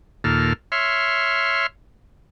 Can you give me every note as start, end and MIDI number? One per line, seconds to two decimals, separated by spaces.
0.24 0.53 39
0.24 0.53 46
0.24 0.53 69
0.24 0.53 89
0.72 1.66 73
0.72 1.66 76
0.72 1.66 84
0.72 1.66 89